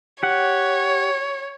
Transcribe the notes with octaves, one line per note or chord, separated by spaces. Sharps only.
G4 C#5 F#5